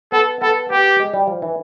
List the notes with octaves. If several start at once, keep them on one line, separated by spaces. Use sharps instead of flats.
B3 A4
B3 A4
B3 G4
G#3
G3
F3
E3